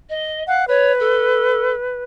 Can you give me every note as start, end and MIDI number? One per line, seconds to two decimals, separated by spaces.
0.09 0.43 75
0.47 0.62 77
0.47 0.65 78
0.68 2.04 71
0.68 0.91 73
0.99 1.71 69